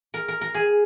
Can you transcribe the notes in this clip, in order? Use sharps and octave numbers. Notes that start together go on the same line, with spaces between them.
A#4
A#4
A#4
G#4